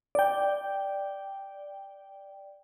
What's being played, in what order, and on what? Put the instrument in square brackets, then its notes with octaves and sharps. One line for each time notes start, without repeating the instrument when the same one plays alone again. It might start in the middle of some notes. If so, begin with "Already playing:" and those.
[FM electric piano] D5 G5